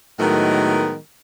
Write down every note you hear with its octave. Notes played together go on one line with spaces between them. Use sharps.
A2 D#3 F#3 G#3 B3 A#4